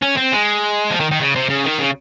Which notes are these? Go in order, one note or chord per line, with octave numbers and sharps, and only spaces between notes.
C#4
C4
G#3
F3
D#3
D#3
C#3
C3
C#3
D#3
C#3